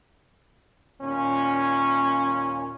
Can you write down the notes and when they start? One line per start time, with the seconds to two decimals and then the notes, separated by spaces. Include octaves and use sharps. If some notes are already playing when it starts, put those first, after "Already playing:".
1.01 D#2 A#2 C#4